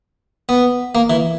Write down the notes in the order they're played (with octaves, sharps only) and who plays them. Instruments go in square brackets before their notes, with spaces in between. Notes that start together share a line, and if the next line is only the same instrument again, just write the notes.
[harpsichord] B3
A#3
E3